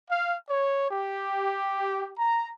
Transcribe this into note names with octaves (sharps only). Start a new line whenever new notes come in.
F5
C#5
G4
A#5